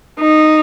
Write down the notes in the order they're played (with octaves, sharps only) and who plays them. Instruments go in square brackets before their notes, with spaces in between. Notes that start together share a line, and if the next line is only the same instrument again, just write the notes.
[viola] D#4